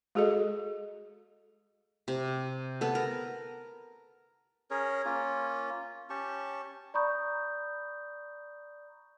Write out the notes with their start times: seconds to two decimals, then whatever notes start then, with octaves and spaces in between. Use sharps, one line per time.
0.15 G#3 F#4 G#4 A4 D#5
2.08 C3
2.81 B3 A4
2.95 A#4
4.71 C#4 G#4 A#4 C#5
5.05 A#3 C#4 F4
6.10 C#4 G4 A5 C#6
6.94 D5 A#5 B5 C#6 D#6 G6